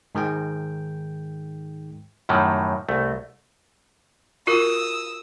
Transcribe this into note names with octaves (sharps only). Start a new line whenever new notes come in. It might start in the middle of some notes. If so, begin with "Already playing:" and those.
G#2 D#3 G#3 G5
F#2 A2 D#3 F#3 G3
C2 A3
F4 F#4 A#4 D#6 E6